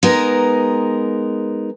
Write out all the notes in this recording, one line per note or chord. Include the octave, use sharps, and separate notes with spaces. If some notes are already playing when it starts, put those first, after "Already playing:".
G#3 B3 D#4 A#4